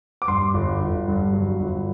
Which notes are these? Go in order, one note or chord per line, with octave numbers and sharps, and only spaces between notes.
D6
G2 C6
G1
G1
G2
F#3
G1